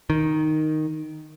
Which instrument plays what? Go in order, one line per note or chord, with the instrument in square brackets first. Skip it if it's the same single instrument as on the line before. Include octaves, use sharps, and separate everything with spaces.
[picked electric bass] D#3